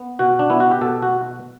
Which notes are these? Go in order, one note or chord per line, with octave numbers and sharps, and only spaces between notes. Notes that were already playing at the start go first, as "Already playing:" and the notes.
Already playing: B3
B2 F#4
D4
B3 E4
F#4
G4
B2 A4
F#4